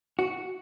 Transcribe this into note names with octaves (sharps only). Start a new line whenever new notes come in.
F#4